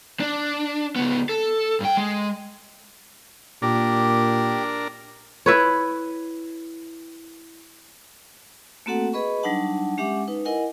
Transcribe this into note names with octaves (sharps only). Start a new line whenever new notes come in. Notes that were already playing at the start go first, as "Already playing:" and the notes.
D4
C#2 B3
A4
G2 G5
G#3
A#2 D4 G4 A#4
E4 B4 C#5
A3 A#3 C4 F#4 A4 F#5
G#4 B4 D#5 B5 C#6
F#3 G3 D4 D#4 F#5 A5
G#3 C#4 G4 E5 F#5 D6
D#4 B4
E4 A#4 D#5 F#5 G#5